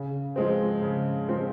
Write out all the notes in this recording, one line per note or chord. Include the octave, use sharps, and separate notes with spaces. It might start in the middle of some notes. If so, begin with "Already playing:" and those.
Already playing: C#3
F3 G#3 C4
C#3
F3 G#3 C4